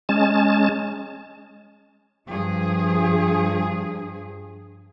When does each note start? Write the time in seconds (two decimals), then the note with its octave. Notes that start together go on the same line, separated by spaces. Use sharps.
0.09 G#3 C#4 A5
2.27 G2 F3 G#4